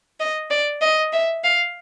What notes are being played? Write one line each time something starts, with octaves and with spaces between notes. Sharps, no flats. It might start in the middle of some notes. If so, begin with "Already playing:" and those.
D#5
D5
D#5
E5
F5